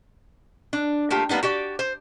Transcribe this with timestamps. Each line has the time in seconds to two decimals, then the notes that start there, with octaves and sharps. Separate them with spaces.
0.73 D4
1.10 A3 A#3 F4 G4
1.29 G3 A#3 B3 D4 D#4
1.43 F#4 G4 D5
1.79 C5